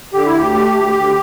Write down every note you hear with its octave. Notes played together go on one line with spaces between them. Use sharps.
D3 G4
E4
D2 G4
A3
D2
D2